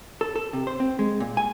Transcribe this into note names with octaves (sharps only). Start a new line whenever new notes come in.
A4
A4
C3
C5
C4
G#3
A#2
G#5